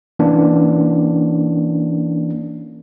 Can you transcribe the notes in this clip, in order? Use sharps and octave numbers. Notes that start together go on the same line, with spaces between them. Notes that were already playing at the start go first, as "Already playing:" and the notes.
E3 A#3 C#4 D4